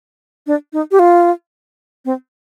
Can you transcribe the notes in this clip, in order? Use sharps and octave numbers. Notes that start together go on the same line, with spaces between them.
D4
D#4
G4
F4
C4